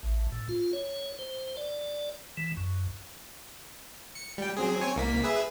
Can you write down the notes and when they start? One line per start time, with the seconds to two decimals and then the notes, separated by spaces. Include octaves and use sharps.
0.03 A1
0.32 A2
0.49 F4
0.73 C#5
1.19 C5
1.57 D5
2.37 E3
2.57 F#2
4.15 C#7
4.38 G3 G5
4.57 F#3 C4 G#4
4.81 C4 C#5 G#5
4.96 C2 A#3 B6
5.23 G#4 B4 E5